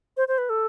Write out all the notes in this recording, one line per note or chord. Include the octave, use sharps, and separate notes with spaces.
C5
C5
B4
A4